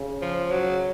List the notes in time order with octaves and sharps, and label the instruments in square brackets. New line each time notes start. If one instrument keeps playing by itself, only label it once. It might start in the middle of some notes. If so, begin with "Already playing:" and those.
Already playing: [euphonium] C#3
[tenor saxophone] F3
F#3